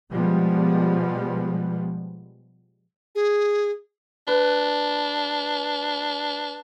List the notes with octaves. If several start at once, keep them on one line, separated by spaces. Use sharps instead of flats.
B2 F3 G3 G#3 B3
G#4
D4 B4